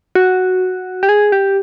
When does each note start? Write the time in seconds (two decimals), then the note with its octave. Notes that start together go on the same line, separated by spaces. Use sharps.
0.15 F#4
1.03 G4
1.09 G#4
1.32 G4